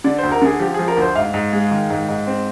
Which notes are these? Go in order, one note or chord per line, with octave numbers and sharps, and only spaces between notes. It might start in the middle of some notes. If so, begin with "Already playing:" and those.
D3 D5
D2 C5
A#4
D3 G#4
F3 G4
G#4
F3
A#4
D2
C5
G#2 F5
G#2
G#3
D#3
G#2
G#2
C4